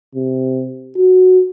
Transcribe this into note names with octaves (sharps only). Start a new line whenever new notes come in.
C3
F#4